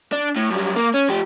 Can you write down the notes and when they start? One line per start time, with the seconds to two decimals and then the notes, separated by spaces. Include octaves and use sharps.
0.13 D4
0.36 A2
0.51 F#2 G3
0.76 A#3
0.94 C#4
1.09 F3 G4